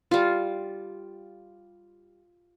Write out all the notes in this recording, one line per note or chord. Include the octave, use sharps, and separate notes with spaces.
G3 F4